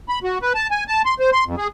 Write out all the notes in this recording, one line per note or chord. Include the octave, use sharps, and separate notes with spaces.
B5
F#4
B4
A5
G#5
A5
C6
C5
C6
F2
G#4